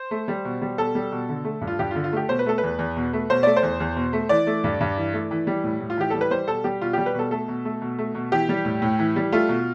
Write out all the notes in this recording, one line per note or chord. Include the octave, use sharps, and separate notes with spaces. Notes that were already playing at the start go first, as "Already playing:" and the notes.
Already playing: C5
A3
G3
B2
G3
B2 A4
G3
B2
D3
A3
G2
F4
G2 G4
F4
D3
F4
A3 G4
B2 C5
B4
A3 A4
B4
E2
E2
B2
A3
B2 C5
A3 D5
C5
E2
E2
B2
A3
E3 D5
A3
G2
G2
E3
A3
E3
G3
A2
A2
F4
E3 G4
G3 A4
B4
G3 C5
B2 A4
G3 G4
B2 F4
G3 G4
B4
B2 A4
A3 A4
B2
A3
B2
A3
B2
E3 G4
G3
A2
A2
E3
G3
A3 F4
B2